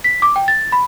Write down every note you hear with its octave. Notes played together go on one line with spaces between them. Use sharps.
B6
D6
G5
A6
B5